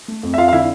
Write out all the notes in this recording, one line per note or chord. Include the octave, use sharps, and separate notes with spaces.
A3
F2
E5
F2 F4 F5
F5
D3 E4 E5